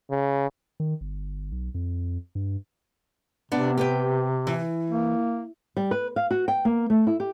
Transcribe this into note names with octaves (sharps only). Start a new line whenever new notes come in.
C#3
D#3
G1
B1
F2
G2
C3 B3 D4
G4 B4 G5
E3
A#3
G3
B4
F5
F#4
G5
A#3
A3
E4
G4